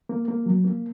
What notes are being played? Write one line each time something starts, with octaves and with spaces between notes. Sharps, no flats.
A#3
A#3
F#3
A#3